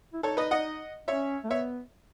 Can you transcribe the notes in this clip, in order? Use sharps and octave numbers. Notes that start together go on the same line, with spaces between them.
E4
D#4 A4 C#5
B4 D#5
D#5 F#5
C#4 C#5 E5
A3
B3 C#5 E5